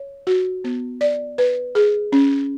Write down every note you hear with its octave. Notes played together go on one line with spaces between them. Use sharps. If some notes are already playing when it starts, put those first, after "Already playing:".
Already playing: C#5
F#4
B3
D5
B4
G#4
C#4